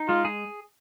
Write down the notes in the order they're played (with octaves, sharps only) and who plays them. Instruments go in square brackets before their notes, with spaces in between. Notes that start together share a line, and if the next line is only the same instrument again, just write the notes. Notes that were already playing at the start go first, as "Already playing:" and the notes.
Already playing: [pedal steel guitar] D#4
[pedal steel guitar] G#3 [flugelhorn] F4
[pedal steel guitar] G#4